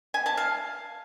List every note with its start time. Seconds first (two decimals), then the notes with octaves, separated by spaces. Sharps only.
0.14 G#5
0.26 A5
0.37 F5